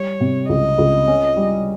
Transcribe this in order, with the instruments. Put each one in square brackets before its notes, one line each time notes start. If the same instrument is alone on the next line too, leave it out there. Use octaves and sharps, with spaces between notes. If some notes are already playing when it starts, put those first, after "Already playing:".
Already playing: [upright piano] G3 [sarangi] C#5
[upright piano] C3
[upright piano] C#2 [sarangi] D#5
[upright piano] C#2
C#4
G3